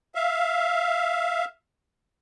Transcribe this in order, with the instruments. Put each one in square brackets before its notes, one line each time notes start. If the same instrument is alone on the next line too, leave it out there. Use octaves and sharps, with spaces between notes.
[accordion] E5 F5